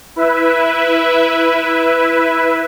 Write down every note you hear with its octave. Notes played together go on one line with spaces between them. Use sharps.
E4 B4 E5